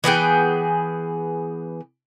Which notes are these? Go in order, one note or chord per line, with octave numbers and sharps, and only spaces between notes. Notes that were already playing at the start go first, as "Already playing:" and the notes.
E3 B3 G#4 G5